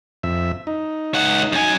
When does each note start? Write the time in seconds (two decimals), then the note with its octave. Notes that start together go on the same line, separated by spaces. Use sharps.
0.23 F2 E5
0.67 D#4
1.14 C#2 F#5
1.53 F#2 G#5